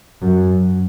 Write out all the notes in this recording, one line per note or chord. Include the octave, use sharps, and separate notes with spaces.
F#2